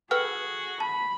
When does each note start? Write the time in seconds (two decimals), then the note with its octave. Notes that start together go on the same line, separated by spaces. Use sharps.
0.11 F#4 G#4 A4 B4 G5 F6
0.80 A5 B5